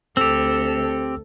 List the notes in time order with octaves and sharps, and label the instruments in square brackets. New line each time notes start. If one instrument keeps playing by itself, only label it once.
[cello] D2 A4 [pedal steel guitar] C4 G4 [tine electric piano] E6